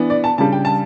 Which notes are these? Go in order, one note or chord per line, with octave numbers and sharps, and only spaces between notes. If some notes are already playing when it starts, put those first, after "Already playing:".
Already playing: E3 B3 D4
D5
A5
C#3 G3 D4 A5
G5
A5